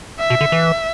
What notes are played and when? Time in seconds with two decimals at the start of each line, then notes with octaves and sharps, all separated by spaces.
0.19 E5
0.30 B2
0.41 D3
0.52 E3